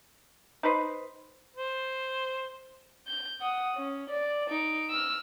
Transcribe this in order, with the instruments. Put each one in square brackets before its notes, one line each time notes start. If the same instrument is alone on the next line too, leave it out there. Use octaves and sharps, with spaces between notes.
[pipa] D#4 B4 C5
[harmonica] C5
[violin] G6
F#5 D#6
C#4
D5
D#4 D7
E6 F6